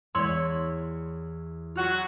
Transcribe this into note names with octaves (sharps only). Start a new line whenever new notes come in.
E2 C#5 D5 C6 E6
F#3 F4 F#4